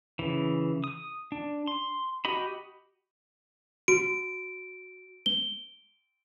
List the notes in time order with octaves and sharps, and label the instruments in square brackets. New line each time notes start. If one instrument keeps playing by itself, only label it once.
[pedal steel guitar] C#3 E3
D#6
D4
C6
F#4 G4 D#5 B5
[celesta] F#4 [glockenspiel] D7
[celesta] G7